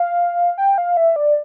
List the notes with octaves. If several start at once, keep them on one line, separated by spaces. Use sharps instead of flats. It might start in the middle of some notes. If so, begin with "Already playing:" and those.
Already playing: F5
G5
F5
E5
D5